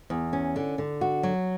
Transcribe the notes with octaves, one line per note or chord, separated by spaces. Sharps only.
E2
C#4
D3
D3
F#4
F#3